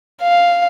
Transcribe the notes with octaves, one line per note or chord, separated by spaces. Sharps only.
F5